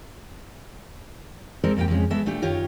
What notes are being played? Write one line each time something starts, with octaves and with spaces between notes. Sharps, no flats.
G#3 C4 A4 A#4 C5 D5
F2 G#2 A#3 F4 G4 G5
F2 C#3 G#3 C#4
F#3 G#3 B3 A4 E5
A#2 A3 D4 G4
F#2 D#3 F4 G4 C#5